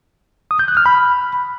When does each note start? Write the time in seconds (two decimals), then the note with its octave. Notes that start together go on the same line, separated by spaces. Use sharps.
0.51 D#6
0.59 G6
0.68 F#6
0.77 F6
0.86 B5